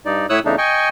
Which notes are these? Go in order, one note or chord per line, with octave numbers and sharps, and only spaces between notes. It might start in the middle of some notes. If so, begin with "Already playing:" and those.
G2 D#4 D5
A2 E4 C#5 D#6 E6 F#6
E2 C#3 A3 D4 D#4
D#5 G5 G#5 C#6